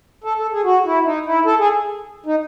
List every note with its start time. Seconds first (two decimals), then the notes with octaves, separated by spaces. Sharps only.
0.24 A4
0.37 A4
0.52 G#4
0.64 F#4
0.85 E4
1.05 D#4
1.26 E4
1.45 A4
1.59 G#4
2.26 D#4